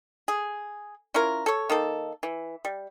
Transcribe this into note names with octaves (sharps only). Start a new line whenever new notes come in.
G#4
C#4 E4 F4 A#4
A4 C#5
D#3 A#3 A4
E3
G3